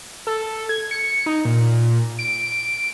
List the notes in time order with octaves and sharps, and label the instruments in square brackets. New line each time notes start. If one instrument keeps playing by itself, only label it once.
[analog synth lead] A4
G#6
C#7
D#4
A#2
D7